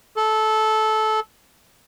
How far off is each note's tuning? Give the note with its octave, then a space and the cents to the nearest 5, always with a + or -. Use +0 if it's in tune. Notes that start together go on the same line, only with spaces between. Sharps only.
A4 -15